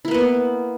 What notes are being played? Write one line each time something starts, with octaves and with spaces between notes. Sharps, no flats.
A#3 B3 E4 B4